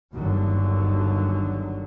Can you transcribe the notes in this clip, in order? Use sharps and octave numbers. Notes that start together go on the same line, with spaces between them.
G1 D#2 D3 F#3